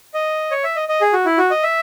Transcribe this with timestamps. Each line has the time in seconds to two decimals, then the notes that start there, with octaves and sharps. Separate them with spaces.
0.14 D#5
0.51 C#5
0.64 E5
0.76 D#5
0.89 D#5
1.01 G#4
1.13 F#4
1.26 E4
1.38 F#4
1.51 D#5
1.63 E5